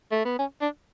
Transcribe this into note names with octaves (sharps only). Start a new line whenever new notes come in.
A3
B3
C#4
D4